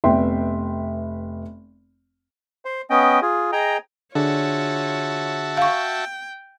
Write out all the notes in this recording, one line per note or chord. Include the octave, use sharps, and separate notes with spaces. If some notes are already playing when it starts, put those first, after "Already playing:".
F1 B3 E5 G5 C6
C5
B3 C#4 D#5 G5
F4 G#4
G#4 D#5 G5 A#5
D3 D4 F4 F#4 G#4 C#5 E5 A5
F5 G5 C#6